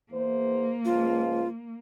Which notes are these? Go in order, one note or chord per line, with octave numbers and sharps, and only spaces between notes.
E2 A#3 C5
C#2 F3 F4